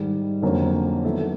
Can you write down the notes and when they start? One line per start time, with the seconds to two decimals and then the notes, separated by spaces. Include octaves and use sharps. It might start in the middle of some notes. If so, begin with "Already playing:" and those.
Already playing: G#2 D#3 G3
0.42 F2 D3 F#3 A#3 C#4
1.05 D#3 F#3 B3 E4 A4